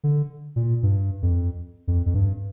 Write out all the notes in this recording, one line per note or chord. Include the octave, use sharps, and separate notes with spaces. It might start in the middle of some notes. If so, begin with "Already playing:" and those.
D3
A#2
G2
F2
F2
F2
G2